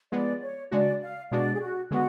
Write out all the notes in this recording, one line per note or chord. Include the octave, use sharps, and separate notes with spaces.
F3 G#3 B3 D5
C#5
C#3 G#3 D4 F#4 D5
F5
B2 G#3 D4 F#4 D5
G#4
F#4
D3 G#3 B3 F#4